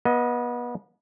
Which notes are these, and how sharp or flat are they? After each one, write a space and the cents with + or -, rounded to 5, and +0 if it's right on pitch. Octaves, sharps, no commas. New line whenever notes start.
B3 -30 D#5 +15